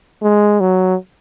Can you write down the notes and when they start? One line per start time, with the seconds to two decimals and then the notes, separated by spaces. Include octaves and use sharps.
0.23 G#3
0.60 F#3